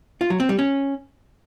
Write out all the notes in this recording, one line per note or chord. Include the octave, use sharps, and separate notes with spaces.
F4
F#3
C4
G3
C#4